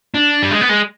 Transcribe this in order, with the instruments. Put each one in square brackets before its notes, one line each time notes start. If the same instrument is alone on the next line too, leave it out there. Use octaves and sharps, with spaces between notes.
[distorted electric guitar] D4
G3
G#3
B3
G#3